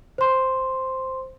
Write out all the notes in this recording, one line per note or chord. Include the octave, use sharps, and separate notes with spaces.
C5 C6